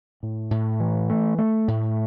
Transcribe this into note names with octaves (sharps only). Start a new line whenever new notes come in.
A2
A2
E3
A3
A3
A2